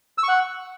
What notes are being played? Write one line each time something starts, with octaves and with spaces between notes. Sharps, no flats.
E6
C#6
F#5